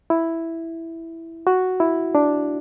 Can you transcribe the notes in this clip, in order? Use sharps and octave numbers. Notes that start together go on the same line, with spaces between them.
E4
F#4
E4
D4